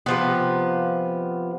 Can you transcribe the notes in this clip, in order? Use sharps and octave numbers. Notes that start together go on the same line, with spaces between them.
C3 F3 B3